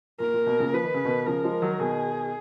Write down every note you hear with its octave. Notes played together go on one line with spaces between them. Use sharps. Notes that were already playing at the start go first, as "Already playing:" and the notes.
A#2 A#4
A#2
B2
A#2 C#3
F3 B4
D#3
C#3
B2 D#3
C#3 F3 A#4
F3 G#3
D#3 F#3
B2 D#3 G#4